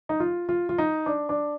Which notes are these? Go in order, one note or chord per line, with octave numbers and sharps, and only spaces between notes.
D#4
F4
F4
F4
D#4
D4
D4